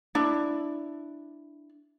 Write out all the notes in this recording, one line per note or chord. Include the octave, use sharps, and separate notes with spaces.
D4 E4